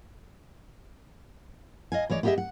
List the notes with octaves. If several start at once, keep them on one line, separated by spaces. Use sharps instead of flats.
D#5 F5 G#5
E3 G#3 C#5 D5
B3 E4 G4 G#4 D#5 E5
F#5